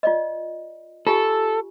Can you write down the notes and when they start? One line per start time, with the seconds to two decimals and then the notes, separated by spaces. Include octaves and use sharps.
0.03 F4 D5 D#5
1.07 F4 G4 A4 G#5